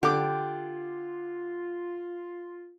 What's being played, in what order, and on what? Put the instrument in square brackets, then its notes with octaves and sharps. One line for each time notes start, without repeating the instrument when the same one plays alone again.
[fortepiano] D3 D6 [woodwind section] F4 [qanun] G4